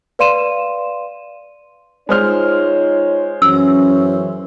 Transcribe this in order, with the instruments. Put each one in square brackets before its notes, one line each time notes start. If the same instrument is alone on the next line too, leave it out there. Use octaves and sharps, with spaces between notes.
[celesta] B4 D5 F5 C6 D#7 E7
[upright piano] G#3 C5 F6 [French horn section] D#4 F4 C#5
[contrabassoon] F#2 [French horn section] E3 C#4 [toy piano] E6